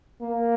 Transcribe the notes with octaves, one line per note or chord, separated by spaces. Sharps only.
A#3